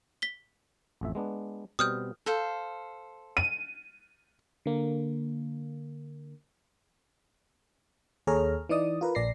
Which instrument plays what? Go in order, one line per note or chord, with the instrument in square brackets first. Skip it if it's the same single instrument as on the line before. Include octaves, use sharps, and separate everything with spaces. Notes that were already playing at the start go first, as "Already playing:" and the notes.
[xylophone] B6 G7
[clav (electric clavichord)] A1 F2 E5
G#3 B3 D4
[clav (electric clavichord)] B2 G3 C4 [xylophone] D#6 F6 G6
[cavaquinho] A4 C5 F5
[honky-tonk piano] D#7
[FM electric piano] D3 A#3
D#2 G#4 A4 C#5 A#5 F6
E3 D#4 D5 D#6
F4 A#4 B4
A#1 D5 A#6 C7